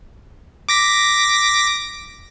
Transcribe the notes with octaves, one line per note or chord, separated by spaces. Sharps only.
D6 A#6 B6